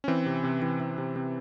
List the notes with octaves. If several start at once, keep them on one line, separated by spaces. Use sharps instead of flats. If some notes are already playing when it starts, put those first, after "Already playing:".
C#4
E3 C4
C3
C3
E3
E3
C3
C3 C4